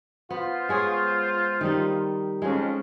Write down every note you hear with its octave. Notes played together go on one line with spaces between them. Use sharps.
B3 F4 C5
G#3 G#4 C#5
D#3 G3 D#4
F2 G#3 C#4